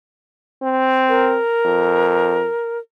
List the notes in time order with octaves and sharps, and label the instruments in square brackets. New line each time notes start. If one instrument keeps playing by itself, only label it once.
[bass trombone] C4
[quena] A#4
[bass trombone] F2